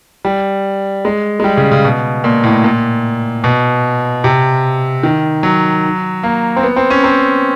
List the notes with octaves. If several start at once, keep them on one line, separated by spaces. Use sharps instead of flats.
G3
G#3
G#3
G3
C#3
C#3
B2
A#2
A2
A#2
B2
C3
D#3
F#3
A#3
C4
B3
C4
C#4
C4